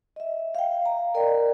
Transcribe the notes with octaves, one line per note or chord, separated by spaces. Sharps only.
D#5 E5
F5 G5
A#5
A#4 D5 D#5 G5